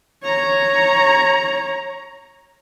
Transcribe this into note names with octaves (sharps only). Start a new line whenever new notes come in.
C#5 A#5